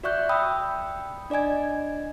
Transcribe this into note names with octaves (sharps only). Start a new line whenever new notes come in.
F#4 D5 E5 C#6 F#6 G6
G5 B5 D#6 E6
D4 D5 D#5 G#5 G#6